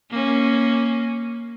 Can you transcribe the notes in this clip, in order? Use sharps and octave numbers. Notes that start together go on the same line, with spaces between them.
A#3 C#4